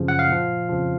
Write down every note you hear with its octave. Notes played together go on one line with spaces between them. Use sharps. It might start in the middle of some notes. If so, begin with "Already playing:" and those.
Already playing: F#2 C#3 F3
F#5
F5
A#2 F3
F2 C#3 F3